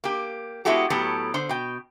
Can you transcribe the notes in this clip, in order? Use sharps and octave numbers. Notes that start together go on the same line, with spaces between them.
A#3 G4
G#3 B3 E4 F#4 G4 A4
A2 F#3 B3 G4 A4
D3 C5
B2 G5